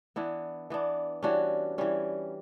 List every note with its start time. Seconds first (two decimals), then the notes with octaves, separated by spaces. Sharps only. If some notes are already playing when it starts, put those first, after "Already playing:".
0.16 E3 B3 D4 E4
0.70 E3 B3 D4
1.23 E3 G3 C#4 D4 F#4
1.78 E3 G3 C#4